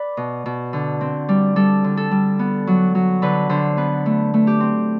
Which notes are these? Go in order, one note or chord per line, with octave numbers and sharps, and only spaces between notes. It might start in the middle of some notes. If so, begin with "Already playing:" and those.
Already playing: B4 D5
B2
B2
D3
C4
G3
G3 A4
D3
A4
G3
B3
F#3
F#3
D3 B4
D3 C5
B3 B4
A3
A3
G4
C4